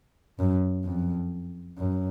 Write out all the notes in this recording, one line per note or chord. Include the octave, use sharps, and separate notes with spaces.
F#2
F2
F#2